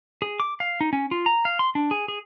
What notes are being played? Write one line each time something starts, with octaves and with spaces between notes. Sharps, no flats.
G#4
D6
F5
D#4
C#4
F4
A#5
F5
C6
D4
G#4
G#4